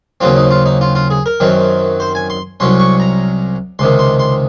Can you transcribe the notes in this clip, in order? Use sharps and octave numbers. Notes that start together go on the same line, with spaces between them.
D#2 C#3 F#3 C4 F4
D#4
F4
D#4
F4
F4
G#4
A#4
F#2 D#3 F#3 C4
C5
G#5
C6
C2 C3 F#3 C#4 C6
C#6
A#5
C#2 C3 D#3 C6
C6
C6